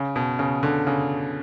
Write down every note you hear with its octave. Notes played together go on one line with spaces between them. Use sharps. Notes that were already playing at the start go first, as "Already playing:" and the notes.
Already playing: C#3
B2
C#3
D3
C#3